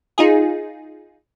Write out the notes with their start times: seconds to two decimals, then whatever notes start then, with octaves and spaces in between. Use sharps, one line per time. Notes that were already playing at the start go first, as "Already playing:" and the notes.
0.18 D#4 F4 G#4